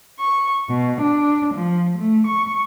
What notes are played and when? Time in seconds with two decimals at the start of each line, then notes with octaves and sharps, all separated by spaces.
0.19 C#6
0.68 B2
1.00 D4
1.53 F3
1.97 A3
2.26 C#6